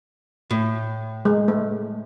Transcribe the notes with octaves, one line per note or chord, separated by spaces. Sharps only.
A2
G#3
A3